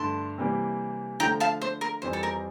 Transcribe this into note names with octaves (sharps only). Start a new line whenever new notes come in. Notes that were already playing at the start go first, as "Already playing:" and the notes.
Already playing: G2 D3 A3 A5 C6
C3 E3 G3 A#3
D3 F3 A3 G5 A#5
F5 A5
C5
A#4
F2 E3 G3 C4 C5
A4
A#4